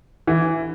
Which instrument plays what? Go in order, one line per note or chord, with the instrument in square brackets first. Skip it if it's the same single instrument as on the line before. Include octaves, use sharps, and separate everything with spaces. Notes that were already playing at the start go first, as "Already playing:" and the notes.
[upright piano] E3